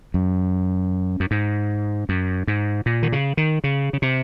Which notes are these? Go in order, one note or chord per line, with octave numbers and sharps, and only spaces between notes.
F#2
F#2
G#2
F#2
G#2
A#2
D#3
C#3
D#3
C#3
C#3
C3